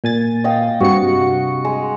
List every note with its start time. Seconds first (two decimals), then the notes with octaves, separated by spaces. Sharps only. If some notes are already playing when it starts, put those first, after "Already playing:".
0.04 A#2 G#5 A6
0.44 D#5 F5 G5
0.80 G2 C3 F#4 C#7
1.65 G#3